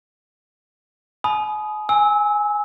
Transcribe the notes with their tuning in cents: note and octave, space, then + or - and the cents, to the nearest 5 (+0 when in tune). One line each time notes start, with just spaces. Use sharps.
G#5 +40 B5 -5 D#6 +0
G#5 +0 E6 -25